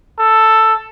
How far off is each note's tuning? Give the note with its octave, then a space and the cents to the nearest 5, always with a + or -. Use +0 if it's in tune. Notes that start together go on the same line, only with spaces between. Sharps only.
A4 +5